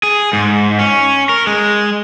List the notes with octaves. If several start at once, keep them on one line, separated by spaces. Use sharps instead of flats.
G#4
G#2
C#4
A#4
G#3